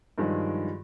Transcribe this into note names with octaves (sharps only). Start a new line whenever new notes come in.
G2 D#3 F3 F#3 G#3